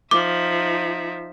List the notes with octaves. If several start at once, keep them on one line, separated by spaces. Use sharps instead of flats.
F3 D#4 E5 D6